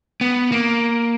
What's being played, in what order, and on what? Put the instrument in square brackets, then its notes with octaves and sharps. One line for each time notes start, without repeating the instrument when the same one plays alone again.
[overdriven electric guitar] B3
A#3